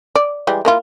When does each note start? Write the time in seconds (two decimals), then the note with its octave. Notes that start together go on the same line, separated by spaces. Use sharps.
0.15 D5
0.47 E3 G3 G#3
0.65 A#3 E4 F4